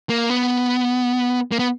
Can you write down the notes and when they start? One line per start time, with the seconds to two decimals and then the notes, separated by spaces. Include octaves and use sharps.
0.09 A#3
0.30 B3
1.52 A#3
1.59 B3